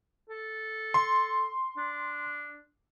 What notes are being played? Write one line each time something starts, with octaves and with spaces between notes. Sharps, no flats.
A4
C6
D4